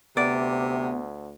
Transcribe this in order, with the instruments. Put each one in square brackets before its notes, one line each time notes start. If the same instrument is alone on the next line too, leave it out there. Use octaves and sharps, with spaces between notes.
[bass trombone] D2 [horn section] C3 [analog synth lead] B3 [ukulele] D5